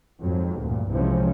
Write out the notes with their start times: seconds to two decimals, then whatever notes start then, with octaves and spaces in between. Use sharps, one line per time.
0.21 F2 G#2 F#3
0.60 D2 G2 A#2
0.90 C2 C3 E3 F3 G#3 C#4